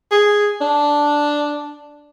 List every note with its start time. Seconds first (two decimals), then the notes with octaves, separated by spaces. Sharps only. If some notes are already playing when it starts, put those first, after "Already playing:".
0.11 G#4
0.61 D4